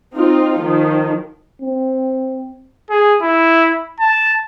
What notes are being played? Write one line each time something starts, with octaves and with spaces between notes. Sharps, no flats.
C4 D#4 F4
D#3 F3
C4
G#4
E4
A5